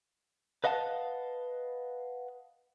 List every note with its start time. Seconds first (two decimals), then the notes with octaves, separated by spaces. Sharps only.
0.64 B4 D#5 F5 F#5 A5